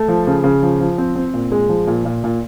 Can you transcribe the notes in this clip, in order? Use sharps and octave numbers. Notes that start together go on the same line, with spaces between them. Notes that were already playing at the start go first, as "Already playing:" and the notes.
Already playing: A3
F3
C#3
C#3
F3
F3
C4
C4
A#2
G#3
F3
A#2
A#2
A#2